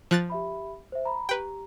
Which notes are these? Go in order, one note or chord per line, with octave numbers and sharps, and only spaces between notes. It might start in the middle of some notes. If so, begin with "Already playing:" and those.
F3 F#6 A6
G4 E5 B5
C5 E5
A#5 B5
G4 B4 G5 A#5